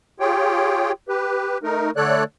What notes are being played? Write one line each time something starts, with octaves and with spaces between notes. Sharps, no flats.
F4 G4 G#4 C#5 G5
G4 B4
A3 D#4 A#4
D3 A3 A4 C#5 D5 F#6